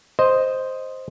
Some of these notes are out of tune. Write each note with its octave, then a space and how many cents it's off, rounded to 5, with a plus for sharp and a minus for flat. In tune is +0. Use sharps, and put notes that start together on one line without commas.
C5 +0 D#5 +0